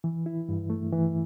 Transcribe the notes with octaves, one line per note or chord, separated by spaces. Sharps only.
E3
E4
G2
A3
E3